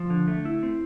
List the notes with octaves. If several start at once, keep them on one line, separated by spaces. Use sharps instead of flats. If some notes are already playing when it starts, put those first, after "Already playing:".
Already playing: F3
D3
A3
E4
C4